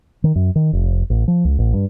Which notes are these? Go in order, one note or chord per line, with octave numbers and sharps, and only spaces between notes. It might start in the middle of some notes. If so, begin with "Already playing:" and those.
D#3
F#2
D#3
F1
A1
F3
C#2
A1
G2